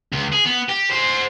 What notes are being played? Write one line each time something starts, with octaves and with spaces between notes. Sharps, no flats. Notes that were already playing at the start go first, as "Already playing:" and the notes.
C#2
G#4
B3
G4
G#4 C5